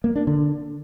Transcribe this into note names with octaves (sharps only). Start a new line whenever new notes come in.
A#3
D4
D3